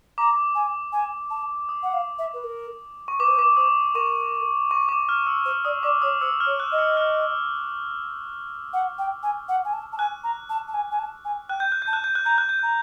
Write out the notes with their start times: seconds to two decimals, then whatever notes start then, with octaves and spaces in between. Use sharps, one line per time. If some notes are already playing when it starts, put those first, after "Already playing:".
0.18 A#5 D6
0.55 G#5
0.92 G#5
1.30 A5
1.69 D#6
1.83 F#5
1.93 F5
2.19 E5
2.34 B4
2.44 A#4
3.08 C#6
3.19 B4 D6
3.28 C5 D#6
3.38 B4 D6
3.57 C5 D#6
3.94 A#4 C#6
4.71 C#6
4.89 D6
5.09 F6
5.27 E6
5.45 C5
5.65 D5 D#6
5.83 D5 D6
6.02 C#5 D#6
6.21 C5 E6
6.40 F6
6.46 C#5
6.60 F#6
6.72 D#5
6.79 E6
6.97 F6
8.73 F#5
8.98 G5
9.23 G#5
9.49 F#5
9.65 G#5
9.73 A5
9.93 A5
9.98 G#5 F#6
10.24 A#5
10.50 A5
10.68 A5
10.74 G#5
10.91 G#5
10.99 A5
11.25 G#5
11.49 G5 F#6
11.60 G6
11.72 F#6
11.82 G6
11.87 A5
11.93 F#6
12.04 G6
12.15 F#6
12.25 A#5 G6
12.38 F#6
12.49 G6
12.59 A#5 F#6